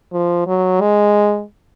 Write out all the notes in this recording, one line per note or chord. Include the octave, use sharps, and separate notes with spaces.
F3
F#3
G#3